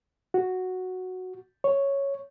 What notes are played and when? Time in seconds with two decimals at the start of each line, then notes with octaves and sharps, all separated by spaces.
0.34 F#4
1.64 C#5